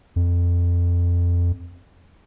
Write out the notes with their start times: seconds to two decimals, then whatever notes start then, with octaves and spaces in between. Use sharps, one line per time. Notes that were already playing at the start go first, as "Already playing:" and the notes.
0.16 F2